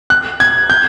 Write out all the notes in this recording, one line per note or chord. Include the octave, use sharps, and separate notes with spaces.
F#6
G#6
G6